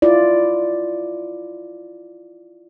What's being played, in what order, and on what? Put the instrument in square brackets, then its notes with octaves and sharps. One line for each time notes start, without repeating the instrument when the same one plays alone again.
[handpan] E4 F4 D5